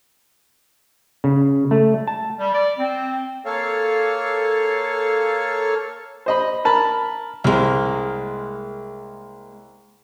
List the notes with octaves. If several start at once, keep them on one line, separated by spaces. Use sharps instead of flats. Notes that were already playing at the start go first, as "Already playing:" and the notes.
C#3
A3
A5
G3
D5
C4
A#3 A4 C#5 F5
C5 D#5 B5
A#4 A5 B5
C2 G#3 A#3